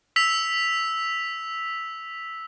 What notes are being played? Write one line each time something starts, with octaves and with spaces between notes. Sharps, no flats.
E6 B6 F7